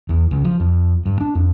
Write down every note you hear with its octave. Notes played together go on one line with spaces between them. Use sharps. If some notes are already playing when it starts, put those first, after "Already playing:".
E2
C#2
F3
F2
G2
D4
F2